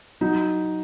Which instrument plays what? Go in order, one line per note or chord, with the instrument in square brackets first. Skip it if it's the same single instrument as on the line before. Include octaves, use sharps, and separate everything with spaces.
[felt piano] F#3 D#4